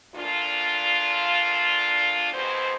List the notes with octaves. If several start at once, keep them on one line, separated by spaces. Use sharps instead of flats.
D2 A#2 D4 F4
F2 G#2 B2 C4 C5